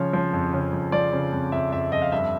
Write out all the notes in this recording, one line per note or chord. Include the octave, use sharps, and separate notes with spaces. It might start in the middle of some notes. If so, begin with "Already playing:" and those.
Already playing: C#3 F3 C#5
F3
F2
C#3
F2
F3 D5
C#3
F2
F2 E5
F2 E5
F2 D#5
F5
G2 E5